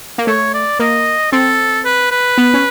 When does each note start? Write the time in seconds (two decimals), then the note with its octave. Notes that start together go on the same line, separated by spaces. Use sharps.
0.18 A#3
0.27 A3 C#5
0.54 D5
0.79 A#3 D#5
1.32 C4 A4
1.85 B4
2.11 B4
2.38 B3
2.54 C#4